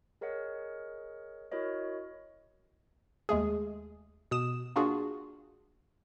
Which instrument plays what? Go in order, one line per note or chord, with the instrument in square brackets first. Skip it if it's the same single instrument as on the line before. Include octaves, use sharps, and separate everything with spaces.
[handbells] G#4 A#4 C#5 D#5 F#5
E4 F#4 A#4 C#5 D#5
[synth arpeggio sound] D#2 G#3 A3 G#4
B2 D#6 E7
A#3 D4 F4 F#4 G#4